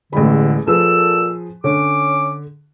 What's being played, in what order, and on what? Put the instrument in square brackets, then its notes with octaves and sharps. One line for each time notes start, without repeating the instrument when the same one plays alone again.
[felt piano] A1 G#3 B5 [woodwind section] E2 G2 D3
[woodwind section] A#2 A4 E6 [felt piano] F3 G#4 B4
[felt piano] D3 [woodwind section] C#4 D6